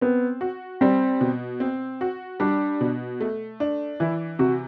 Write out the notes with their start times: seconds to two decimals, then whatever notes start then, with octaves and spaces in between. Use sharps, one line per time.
0.01 B3 C4
0.41 F#4
0.81 G3 C4
1.21 B2
1.60 C4
2.01 F#4
2.40 G3 D4
2.81 B2
3.20 A3
3.60 D4
4.00 E3 E4
4.39 C3 F#4